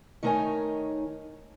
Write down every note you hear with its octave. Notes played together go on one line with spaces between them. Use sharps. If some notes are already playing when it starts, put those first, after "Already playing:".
D#3 A3 D#4 A#4 C#5 G#5